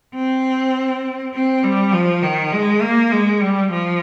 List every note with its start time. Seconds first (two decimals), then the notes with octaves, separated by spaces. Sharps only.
0.15 C4
1.34 C4
1.63 G3
1.93 F3
2.23 D#3
2.52 G#3
2.82 A#3
3.12 G#3
3.41 G3
3.72 F3